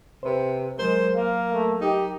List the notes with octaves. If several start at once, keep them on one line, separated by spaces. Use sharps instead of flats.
C3 B4 C5
F#3 G#3 A#4 C5
A#3 F5
A3
D#4 G4